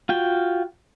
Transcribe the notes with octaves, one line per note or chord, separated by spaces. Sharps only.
F4 F#4 G5